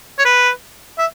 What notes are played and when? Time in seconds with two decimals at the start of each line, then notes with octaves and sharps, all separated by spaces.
0.19 C#5
0.25 B4
0.98 E5